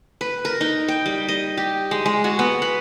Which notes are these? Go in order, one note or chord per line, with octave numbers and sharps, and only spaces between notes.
B4
A#4
D#4
G5
G3
D#5
G4
G#3
G#3
F#4
B3
B4